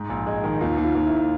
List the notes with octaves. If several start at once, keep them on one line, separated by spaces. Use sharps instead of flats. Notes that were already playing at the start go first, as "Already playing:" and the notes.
Already playing: G#2
A#1
G#3
D#3
D#2 F4
D#2
F4
D#2
E4